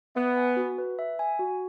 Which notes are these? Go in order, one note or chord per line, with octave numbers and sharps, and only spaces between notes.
B3 E5
G#5
F#4
B4
E5
G#5
F#4